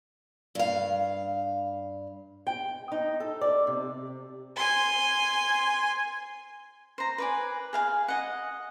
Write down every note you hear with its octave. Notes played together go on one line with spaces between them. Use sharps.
G2 F5
G5
D#4
A4
D5
C3
G#5 C6
C5 A#5
B4 D5 G#5
G#4 F5 G#5
D#5 F#5